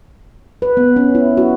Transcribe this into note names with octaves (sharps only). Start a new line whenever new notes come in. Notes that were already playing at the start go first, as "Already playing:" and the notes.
B4
B3
C#4
E4
F#4